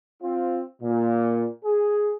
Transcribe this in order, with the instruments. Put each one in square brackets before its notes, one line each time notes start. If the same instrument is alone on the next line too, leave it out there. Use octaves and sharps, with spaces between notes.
[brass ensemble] C4 F4
A#2
G#4